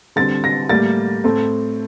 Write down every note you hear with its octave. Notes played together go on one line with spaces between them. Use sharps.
D3 G3 C4 A6
A#6
A2 G3 A#3 A6
A2 A3 C4